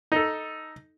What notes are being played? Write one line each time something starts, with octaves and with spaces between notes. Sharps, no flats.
D#4 A4